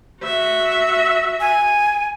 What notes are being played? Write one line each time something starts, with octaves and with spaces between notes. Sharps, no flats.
F#4 E5
G#5